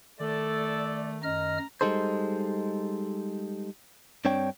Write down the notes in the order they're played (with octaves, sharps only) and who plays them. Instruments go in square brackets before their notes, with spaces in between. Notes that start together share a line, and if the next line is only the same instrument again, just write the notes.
[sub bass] D#3 [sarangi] A3 [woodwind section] A4 D5
[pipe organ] F#2 D#5 F6 [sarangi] A#5
[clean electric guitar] G3 G#3 D#4 A4 C5
G2 C4 D4 C#5 G5